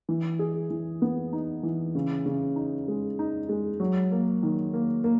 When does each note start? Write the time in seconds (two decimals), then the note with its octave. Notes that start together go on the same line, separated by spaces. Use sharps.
0.09 E3
0.39 G#4
0.70 E3
1.02 B3
1.33 D#4
1.63 E3
1.95 C#3
2.26 C#3
2.56 D#4
2.88 G#3
3.19 D#4
3.49 G#3
3.80 F#3
4.12 A#3
4.43 D#3
4.73 A#3
5.04 A#3